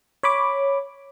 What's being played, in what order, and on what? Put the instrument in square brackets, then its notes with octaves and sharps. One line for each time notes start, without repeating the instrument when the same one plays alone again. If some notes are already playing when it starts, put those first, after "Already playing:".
[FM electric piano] C#5 B5 D6